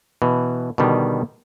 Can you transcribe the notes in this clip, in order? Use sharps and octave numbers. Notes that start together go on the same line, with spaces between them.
B2 E3
B2 D3 D#3 G3